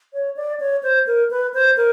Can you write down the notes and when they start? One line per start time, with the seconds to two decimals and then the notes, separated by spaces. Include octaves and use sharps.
0.13 C#5
0.36 D5
0.60 C#5
0.83 C5
1.07 A#4
1.30 B4
1.54 C5
1.77 A#4